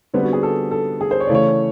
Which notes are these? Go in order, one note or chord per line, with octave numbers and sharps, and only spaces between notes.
D3 G3 B3 C4
F#4
G#4
A4
A4
G#4
C5
C#5
C#3 E3 A3 D5
C#5